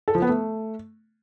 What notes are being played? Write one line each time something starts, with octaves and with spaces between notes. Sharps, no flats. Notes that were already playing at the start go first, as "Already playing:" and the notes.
A4
F3
B3
A3